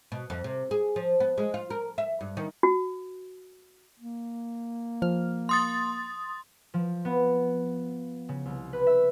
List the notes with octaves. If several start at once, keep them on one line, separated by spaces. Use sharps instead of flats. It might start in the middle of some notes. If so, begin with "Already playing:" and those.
B2
F2
C3
G#4
F3
B3
G#3
F4
A#4
E5
G2
D#3
F#4
A#3
F3 F6
C6 D#6 A6
F3
B3
C#3
C2
B4
E5